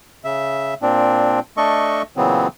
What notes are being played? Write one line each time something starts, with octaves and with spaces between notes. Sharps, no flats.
C#3 E5
A#2 C4 D4
A3 D4 A4 D#5 C#6
A#2 C#3 E3 F#3 B3 C4